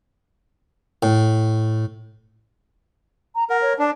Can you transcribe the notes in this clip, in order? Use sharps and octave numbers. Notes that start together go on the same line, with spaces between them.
A2
A#5
A#4 F#5
C#5
D4 A5